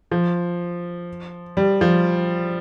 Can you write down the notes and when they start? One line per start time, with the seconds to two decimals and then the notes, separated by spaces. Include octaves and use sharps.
0.11 F3
1.57 G3
1.81 F3